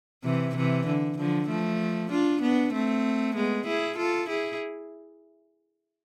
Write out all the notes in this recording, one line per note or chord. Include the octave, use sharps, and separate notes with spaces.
C3 E3
C3 E3
D3
D3 F3
F3 A3
D4 F4
B3 D4
A3 C4
G#3 B3
E4 G#4
F4 A4
E4 G#4